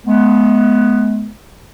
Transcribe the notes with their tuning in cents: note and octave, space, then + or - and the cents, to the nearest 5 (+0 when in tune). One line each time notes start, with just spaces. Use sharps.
G#3 +40 B3 +0